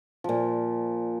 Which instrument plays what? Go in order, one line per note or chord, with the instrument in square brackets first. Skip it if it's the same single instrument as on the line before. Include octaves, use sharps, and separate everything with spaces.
[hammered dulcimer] A#2 F3